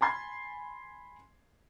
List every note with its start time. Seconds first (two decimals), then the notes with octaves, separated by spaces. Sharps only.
0.01 G#5 B5 C6 G#6 A6